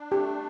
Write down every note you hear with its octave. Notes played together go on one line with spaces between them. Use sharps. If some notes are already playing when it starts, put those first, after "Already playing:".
Already playing: D4
A3 G4